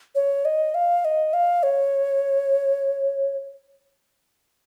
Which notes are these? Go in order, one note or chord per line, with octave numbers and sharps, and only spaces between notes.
C#5
D#5
F5
D#5
F5
C#5